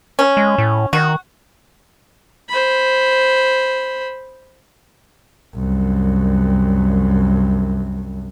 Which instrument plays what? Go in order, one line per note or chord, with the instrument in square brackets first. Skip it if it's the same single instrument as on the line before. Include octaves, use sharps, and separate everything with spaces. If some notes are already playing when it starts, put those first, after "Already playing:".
[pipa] C#4
[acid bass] G#3
A2
[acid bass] D#3 [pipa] F#4
[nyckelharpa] C5 B5
[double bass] C2 F#2